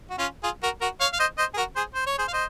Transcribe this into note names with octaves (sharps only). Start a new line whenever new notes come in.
F#4
C#4 F4
F4 G#4
F#4 A#4
F#4 A#4
C#5 F5
F5
C5 D#5
C5 D#5
G#4
F#4 A#4
G#4 C5
C5
C#5
G#4 C5
F5
C5 D#5